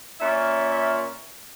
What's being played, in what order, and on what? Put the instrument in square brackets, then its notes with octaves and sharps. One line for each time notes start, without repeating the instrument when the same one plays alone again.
[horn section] A#2 C#4 E5